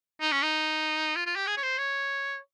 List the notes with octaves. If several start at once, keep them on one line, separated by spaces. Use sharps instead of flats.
D#4
C#4
D#4
F4
F4
G4
G#4
C#5
C5
C#5